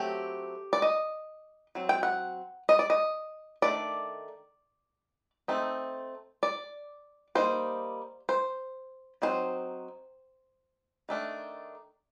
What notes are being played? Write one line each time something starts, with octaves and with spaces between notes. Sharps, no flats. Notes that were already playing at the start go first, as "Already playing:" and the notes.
Already playing: F#3 A3 C4 G4
D5
D#5
F#3 C4
G5
F#5
D#5
D5
D#5
D#3 A3 D4 D5
A3 C4 D#4
D5
G3 A#3 D#4 C5
C5
F#3 C4 D#4 C5
D#3 A3 D4